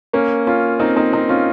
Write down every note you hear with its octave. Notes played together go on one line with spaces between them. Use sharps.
A#3 C#4
C#4 F4
C4 D#4
C4 D#4
C4 D#4
C#4 F4